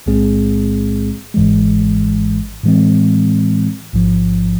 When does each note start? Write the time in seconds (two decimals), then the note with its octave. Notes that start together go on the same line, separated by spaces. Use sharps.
0.06 B1 A2 G#3 C4 G#4
1.34 G#1 G#2 E3 G#3
2.63 A2 E3 G#3 C4
3.93 A1 G#2 F3